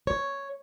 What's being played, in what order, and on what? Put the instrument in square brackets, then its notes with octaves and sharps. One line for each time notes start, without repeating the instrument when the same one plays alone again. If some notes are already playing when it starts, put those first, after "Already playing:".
[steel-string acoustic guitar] C#5